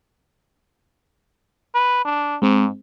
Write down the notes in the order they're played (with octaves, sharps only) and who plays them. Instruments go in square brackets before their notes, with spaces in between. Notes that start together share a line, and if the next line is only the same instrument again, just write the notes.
[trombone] B4
D4
[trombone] G#2 [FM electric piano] G#3 C4